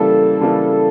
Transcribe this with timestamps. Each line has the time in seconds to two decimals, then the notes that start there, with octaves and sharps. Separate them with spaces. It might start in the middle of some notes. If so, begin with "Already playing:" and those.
Already playing: C#3 E3 G3 A#3 A4
0.41 C#3 E3 G3 A#3